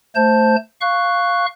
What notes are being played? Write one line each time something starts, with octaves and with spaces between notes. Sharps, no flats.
A3 C5 A5 G6
F5 C#6 F#6